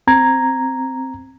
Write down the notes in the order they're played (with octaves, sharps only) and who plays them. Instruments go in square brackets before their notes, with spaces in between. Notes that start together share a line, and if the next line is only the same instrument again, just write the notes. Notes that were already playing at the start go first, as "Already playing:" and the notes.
[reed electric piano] C4 A#5 G#6